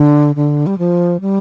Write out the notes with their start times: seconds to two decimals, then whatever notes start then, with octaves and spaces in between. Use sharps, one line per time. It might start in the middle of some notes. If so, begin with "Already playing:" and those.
Already playing: D3
0.35 D3
0.66 G3
0.78 F3
1.21 G3